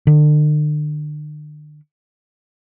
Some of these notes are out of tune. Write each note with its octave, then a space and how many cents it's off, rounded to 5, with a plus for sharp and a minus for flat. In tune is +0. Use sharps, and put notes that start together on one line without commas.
D3 +40